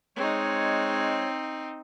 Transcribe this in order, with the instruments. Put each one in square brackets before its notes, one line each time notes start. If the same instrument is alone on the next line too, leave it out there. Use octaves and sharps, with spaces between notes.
[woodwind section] G#3 C#5 [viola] C4 D#4